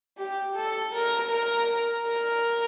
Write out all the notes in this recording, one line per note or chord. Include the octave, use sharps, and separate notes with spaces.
G4
A4
A#4
A#4
A#4